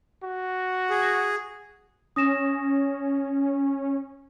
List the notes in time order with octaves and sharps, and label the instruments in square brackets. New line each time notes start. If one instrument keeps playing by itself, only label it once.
[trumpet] F#4
[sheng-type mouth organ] G#4
[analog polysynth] C#4 [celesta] D#6 A#6 E7